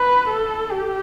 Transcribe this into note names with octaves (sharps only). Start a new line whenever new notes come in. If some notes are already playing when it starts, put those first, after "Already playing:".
Already playing: B4
A4
G4